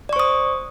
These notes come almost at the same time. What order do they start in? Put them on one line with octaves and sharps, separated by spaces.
D5 C#6 C5 D#6